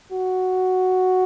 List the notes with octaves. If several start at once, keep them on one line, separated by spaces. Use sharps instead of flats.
F#4